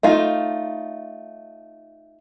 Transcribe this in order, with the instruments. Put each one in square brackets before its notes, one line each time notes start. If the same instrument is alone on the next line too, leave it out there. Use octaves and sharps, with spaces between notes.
[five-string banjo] A3 D#4 F4